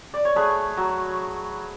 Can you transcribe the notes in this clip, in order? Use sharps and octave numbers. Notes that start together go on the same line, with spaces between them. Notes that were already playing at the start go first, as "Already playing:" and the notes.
D5
C#5
A3 G#4 B4
F#3